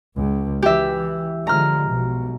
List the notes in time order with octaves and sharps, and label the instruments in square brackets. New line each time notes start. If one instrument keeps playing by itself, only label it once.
[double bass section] C#2
[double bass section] E3 [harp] G4 E5
[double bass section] D3 F3 G#3 [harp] A#5 F6
[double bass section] B1 B2